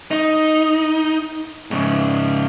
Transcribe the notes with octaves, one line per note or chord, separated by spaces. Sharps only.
D#4
G#2 C#3